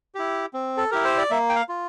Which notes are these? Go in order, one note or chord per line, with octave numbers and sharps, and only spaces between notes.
E4 G4
C4
A4
E4 G4 A#4
C5
D5
A#3 E5
G5
F5
F4